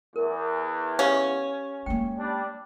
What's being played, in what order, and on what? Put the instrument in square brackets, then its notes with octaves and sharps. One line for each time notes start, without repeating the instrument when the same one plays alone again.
[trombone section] E2 [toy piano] A#4
[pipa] C#4 [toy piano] G4 F5
[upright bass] G#3 A#3 [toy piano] G5
[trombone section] G3 D4